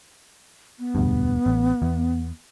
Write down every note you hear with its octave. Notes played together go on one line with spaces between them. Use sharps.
B3
E1 D2 G2
A1
E2